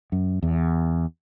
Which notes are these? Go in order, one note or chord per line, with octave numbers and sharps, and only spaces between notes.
F#2
E2